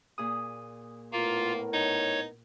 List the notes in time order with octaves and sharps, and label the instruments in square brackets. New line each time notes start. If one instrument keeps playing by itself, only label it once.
[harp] A#2 G#4 D#6
[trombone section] A2 B3 A#4 [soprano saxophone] A#3 [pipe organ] F4
[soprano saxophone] D#4 [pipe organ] C#5